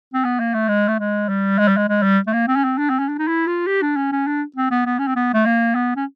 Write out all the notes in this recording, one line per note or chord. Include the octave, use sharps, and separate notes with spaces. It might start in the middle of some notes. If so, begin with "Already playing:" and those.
C4
B3
A#3
A3
G#3
A3
G#3
G3
G#3
G3
G#3
G#3
G3
A3
A#3
C4
C#4
C4
D4
C4
C#4
D4
D#4
E4
F4
G4
D4
C#4
C#4
D4
C4
B3
B3
C#4
C4
B3
A3
A#3
B3
C#4